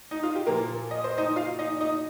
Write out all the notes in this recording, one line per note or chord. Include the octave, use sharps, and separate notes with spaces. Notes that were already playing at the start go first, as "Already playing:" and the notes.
D#4
F4
G4
A#2 F3 A#3 A#4
D#5
C5
D#4 D#5
F4 F5
D#4 D#5
D#4 D#5